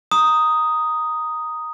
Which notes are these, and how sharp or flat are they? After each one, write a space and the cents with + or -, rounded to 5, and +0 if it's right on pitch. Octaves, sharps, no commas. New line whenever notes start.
A#5 +0 D#6 +0